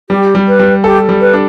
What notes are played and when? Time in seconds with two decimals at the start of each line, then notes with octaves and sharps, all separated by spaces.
0.10 G3 G4
0.35 G3
0.48 B4
0.59 G3
0.84 G4 A4
1.09 G3
1.21 B4
1.33 D4